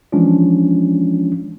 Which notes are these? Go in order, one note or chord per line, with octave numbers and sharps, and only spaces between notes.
E3 F3 G#3 C#4 D4 F4